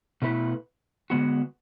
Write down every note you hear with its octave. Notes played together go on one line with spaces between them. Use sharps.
B2 A3 E4 B4
D3 G#3 B3 F#4